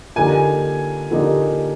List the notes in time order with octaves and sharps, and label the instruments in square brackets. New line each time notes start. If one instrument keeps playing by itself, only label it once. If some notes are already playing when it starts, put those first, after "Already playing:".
[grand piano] D3 F3 A#3 D#4 G4 [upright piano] G#5
[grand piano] D3 F3 A#3 D#4 G4